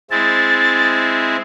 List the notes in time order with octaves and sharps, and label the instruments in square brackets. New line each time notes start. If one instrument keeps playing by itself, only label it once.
[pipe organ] G#3 C4 E4 [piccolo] A6